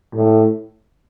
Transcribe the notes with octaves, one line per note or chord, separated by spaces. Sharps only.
A2